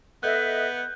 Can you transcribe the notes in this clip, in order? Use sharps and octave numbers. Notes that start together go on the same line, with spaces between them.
B3 A4 D#5 E5 F#6 G6